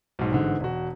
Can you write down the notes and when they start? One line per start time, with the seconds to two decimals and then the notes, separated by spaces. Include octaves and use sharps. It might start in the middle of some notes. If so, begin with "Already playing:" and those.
0.19 B1 G#2
0.31 A1 G#2 D3
0.60 E1 F#4